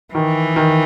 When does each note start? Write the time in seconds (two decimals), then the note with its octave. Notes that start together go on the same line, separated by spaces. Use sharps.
0.14 D#3 E3
0.56 D#3